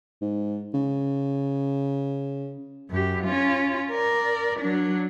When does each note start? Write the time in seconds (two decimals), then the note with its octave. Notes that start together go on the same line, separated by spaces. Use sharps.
0.22 G#2
0.74 C#3
2.91 F#2 G4
3.24 C#4 F4
3.91 A#4 D5
4.60 F#3 D4